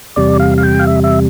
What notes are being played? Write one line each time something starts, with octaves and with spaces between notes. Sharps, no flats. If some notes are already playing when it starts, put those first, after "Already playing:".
E2 C3 G3 D5
F5
F5
G5
F5
E5
E5